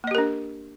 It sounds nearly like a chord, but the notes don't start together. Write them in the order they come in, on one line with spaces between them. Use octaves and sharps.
A#3 D#5 G4 A#4 D4